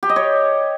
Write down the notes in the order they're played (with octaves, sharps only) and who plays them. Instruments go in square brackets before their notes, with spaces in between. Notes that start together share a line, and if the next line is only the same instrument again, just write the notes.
[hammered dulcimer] G4
D#5
C#5